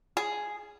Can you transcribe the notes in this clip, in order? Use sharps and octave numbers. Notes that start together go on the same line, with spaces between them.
G#4